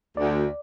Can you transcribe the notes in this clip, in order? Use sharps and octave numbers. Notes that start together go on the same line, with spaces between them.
D2 D5